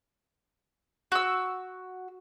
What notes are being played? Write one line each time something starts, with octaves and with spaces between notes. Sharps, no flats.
F#4 E6